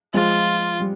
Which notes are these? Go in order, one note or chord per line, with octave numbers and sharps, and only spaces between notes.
F3 G#3 F4
G3